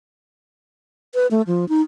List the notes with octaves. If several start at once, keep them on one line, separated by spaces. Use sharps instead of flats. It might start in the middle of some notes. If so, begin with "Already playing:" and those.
B4
A3
F3
D#4